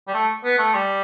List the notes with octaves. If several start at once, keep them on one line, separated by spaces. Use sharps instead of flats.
G3
A3
B3
A3
G3